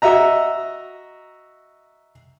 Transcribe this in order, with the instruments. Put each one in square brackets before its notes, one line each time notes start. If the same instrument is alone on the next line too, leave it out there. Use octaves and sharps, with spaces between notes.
[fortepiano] F#4 D#5 E5 A#5